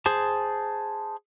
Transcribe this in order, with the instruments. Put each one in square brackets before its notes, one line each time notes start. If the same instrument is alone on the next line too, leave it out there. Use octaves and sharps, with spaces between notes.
[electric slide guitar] G#4 C5 A5